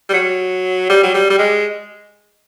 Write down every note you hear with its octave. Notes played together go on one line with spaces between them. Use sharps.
G3
F#3
G3
F#3
G3
G3
G#3